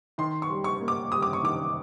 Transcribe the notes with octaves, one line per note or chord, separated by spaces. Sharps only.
D#3 C6
C#6
G3
C#6
A#3
D6
G3 D#6
D6
C#6
D#3 D6